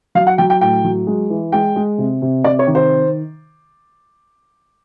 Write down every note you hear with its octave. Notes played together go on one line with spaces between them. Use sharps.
F#3 F5
F#5
F#3 G5
G5
A2 G5
F#3
G#3
E3
G#3 G5
G#3
C3
C3
C3 D5
C#5
D#3
C5